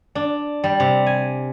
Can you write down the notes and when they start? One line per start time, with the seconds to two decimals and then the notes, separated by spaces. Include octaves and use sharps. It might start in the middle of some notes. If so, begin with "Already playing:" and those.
0.15 D4
0.64 G3
0.80 C3
1.06 G#5